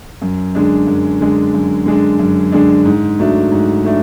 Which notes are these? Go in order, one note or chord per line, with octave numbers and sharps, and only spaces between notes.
F#2
D3 G#3 D4
F#2
D3 G#3 D4
F#2
D3 G#3 D4
F#2
D3 G#3 D4
G#2
F#3 A3 D4
G#2
F#3 A3 D4